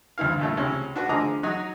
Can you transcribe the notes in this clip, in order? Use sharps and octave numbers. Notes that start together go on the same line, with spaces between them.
D2 G2 E3 F5
G2 A#2 A3
C#2 C3 C#4
D4 F#4 B4
D3 F3 G#4 D#5 A#5 D6
F#3 D#4 F#4